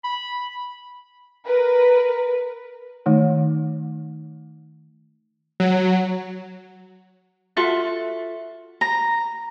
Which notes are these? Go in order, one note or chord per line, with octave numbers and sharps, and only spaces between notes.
B5
A#4 B4
D#3 A3 D#4
F#3
F4 F#4 A4 E5
A#5